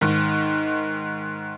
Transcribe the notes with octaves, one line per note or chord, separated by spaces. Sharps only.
G#2 D#3